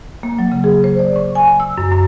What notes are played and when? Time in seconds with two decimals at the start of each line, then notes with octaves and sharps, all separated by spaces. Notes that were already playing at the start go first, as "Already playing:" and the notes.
0.23 A#3
0.39 F#3
0.52 C#3
0.64 G#4
0.84 C5
0.99 D5
1.16 C#6
1.35 G#5
1.60 E6
1.78 F#2
1.91 F#2